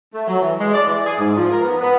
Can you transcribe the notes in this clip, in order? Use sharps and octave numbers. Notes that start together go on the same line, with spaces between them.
A3
F#3
E3
G#3
D5
E3
G#4
G#2
F3
A#4
B3
B3